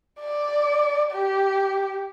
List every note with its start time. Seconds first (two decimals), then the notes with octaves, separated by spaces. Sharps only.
0.20 D5
1.12 G4